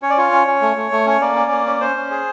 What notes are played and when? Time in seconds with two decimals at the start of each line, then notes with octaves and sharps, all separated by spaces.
0.02 C#4 C#5
0.10 D5
0.17 F4 C#5
0.32 C#4
0.47 C#4
0.62 A3
0.76 A3
0.91 A3
1.06 C#4 C#5
1.21 A#3 D5
1.36 C#4
1.51 A#3
1.66 C#4
1.81 C#4 C5
1.96 C#4
2.11 G#4